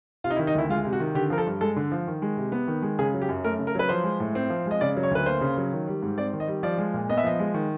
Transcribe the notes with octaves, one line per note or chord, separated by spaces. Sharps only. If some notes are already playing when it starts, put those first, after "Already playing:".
C3 F4
D#4
E4
D#3
D#4
D2 E4
G#3 F4
C3
F#4
D#3
D3 G4
F3 A#4
A4
G2
G#3 A4
D3
F3
D#3
G#3
C3
B3
D#3
G#3
C#3 G#4
F#3
G4
F#2
A3 A#4
C#3
A#4
F#3 B4
F3 C5
G#3
A2
C4
F3
G#3 D#5
C#3 D5
F#3
C#5
D2 B4
A#3 C5
C#3
F#3
D#3
G3
G#2
C4 D5
D#3
D#5
G3
F3 D5
G#3
A#2
B3 D#5
E5
F3 D#5
G#3
D#3